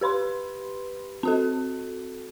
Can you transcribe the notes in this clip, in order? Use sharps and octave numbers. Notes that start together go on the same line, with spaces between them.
G4 B4 B5 C6
C4 F#4 A4